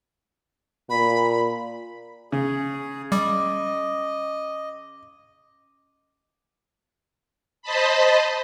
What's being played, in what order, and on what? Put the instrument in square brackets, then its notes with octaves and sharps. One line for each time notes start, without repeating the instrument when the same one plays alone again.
[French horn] A#2 [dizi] B5
[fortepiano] C#3 [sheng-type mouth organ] G#4
[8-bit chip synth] G3 [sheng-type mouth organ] D#5 [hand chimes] D6
[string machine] C5 D#5 A5 B5